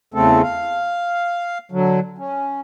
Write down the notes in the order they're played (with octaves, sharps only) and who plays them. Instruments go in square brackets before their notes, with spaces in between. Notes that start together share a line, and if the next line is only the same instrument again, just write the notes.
[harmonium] E2 C#3 A3 C4 A4
F5
D3 F#3
C#4